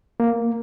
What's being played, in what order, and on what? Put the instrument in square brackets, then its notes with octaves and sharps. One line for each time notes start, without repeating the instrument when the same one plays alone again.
[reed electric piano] A#3